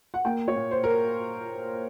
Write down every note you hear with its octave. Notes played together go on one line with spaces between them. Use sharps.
F#5
A#3 G5
C#5
A#2
C5
A#4